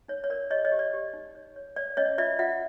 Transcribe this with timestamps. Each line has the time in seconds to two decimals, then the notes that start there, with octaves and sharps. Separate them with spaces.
0.08 D#4 C#5
0.24 C#5
0.30 A#4 D5
0.51 G4 C#5 D#5
0.65 C#5 D#5
0.72 G4
0.79 D5
0.93 G4
1.13 D#4
1.35 C#5
1.56 C#5
1.76 C#5 D5
1.97 C#4 C#5 D#5
2.18 F4 D5 E5
2.39 F4 E5 F#5